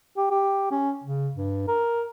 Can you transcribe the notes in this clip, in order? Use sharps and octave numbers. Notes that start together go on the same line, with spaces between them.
G4
G4
C#4
C#3
G2
A#4